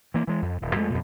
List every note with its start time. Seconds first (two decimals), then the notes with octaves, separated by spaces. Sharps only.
0.14 E3 A#3
0.27 E3 G#3
0.42 F2
0.62 D#1
0.75 F2 G#3 A3
0.90 F2 B2